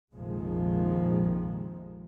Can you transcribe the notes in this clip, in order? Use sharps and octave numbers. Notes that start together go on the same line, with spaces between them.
A#1 F2 C3 D#3 F3 G#3